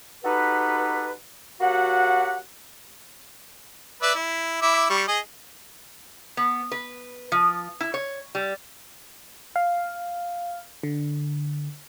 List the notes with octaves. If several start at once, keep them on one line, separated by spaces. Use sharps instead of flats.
D#4 F#4 G4 A4 B4
F#3 A#3 F#4 G4 F#5
B4 D5 E5
E4
E4 E5 D6
G3 C#6
G#4 D#5
B3
B4
F3
E4
C#5
G3
F5
D3